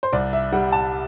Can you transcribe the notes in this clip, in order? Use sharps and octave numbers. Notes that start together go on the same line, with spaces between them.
C5
C2 D5
E5
G3 F#5
A5